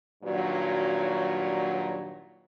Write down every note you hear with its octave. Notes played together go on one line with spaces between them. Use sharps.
G2 A#2 D#3 F#3